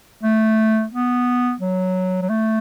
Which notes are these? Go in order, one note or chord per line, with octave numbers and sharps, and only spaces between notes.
A3
B3
F#3
F#3
A3